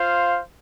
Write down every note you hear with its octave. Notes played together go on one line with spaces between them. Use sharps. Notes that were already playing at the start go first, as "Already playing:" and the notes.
Already playing: F4 C5 F5